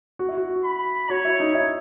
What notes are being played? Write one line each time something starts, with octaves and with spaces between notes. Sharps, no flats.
F#4
E4
F#4
B5
F#4 C#5
E4
D#4
E4